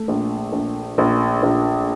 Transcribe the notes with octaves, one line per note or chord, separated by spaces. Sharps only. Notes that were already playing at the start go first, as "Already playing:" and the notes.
Already playing: A3
A#1
A#1
A#1
A#1